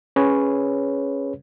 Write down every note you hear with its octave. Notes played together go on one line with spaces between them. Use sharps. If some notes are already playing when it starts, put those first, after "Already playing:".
C#4 G#4 B4 C#5